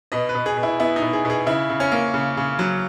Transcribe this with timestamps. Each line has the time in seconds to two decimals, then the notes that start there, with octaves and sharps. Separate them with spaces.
0.12 B2 D#5
0.29 B4
0.35 B2
0.46 G#4
0.57 B2
0.63 E4
0.79 B3 E4
0.96 D#4
1.02 B2
1.13 G#4
1.25 B2 G#4
1.46 C#3 E4
1.70 C#3
1.80 C#4
1.92 A#3
2.14 C#3
2.37 C#3
2.59 F#3